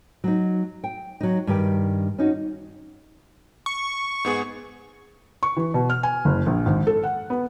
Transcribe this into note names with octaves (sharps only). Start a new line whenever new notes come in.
F#3 D#4
G5
F#3 D#4
G2 D#3 G4
C#4 D#4 F#4
C#6
G#2 B3 G#4
C#6
E3
B2
F6
G#5
F#1
A#1
G#1
A4
F#5
B3